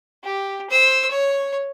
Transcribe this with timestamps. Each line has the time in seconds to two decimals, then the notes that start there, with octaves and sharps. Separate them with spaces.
0.24 G4
0.70 C5 E6
1.11 C#5